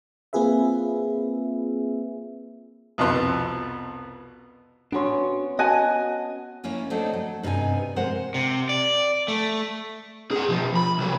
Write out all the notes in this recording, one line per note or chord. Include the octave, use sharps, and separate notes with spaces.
A#3 C4 F4 G#4 B4 E5
C2 F2 B2 F3 B3 C6
B3 C#4 D4 F#4 C6
F#4 D#5 G#5 A5
A#3 C#4 E4 F4 G#5
F#3 A3 C4 D4 D#4 A4
F#3
G2 C3 B3 D#4 G#5
C3 G#3 A#4 C5 F#5
C3
D5
A3
G#4 F#5
B2 F3
B5
C2 F#3